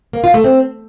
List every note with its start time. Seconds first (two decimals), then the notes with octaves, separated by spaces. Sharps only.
0.13 A#3
0.24 F4
0.34 A3
0.44 C4